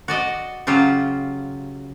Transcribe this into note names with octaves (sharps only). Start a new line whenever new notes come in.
F#4 D5 D#5
C#3 F#3 F4 G4